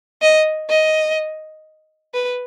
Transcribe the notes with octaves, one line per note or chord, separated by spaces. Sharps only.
D#5
D#5
B4